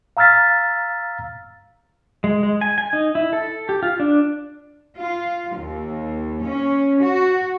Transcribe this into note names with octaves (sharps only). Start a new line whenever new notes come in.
F5 A#5 E6 F6 A6 B6
G#3
G#3
G#5
G#5
D#4
E4
A4
G4
F4
D4
F4
D#2
C#4
F#4